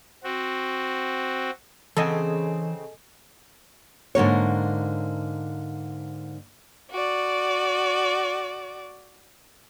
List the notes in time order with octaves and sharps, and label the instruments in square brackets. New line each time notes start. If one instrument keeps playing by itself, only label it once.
[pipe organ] C4 F#4
[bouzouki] C#3 C4 [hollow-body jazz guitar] E3 F#5 [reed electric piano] A4 D#5 G#5
[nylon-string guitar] G#2 D3 A#3 C#5
[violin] F#4 D5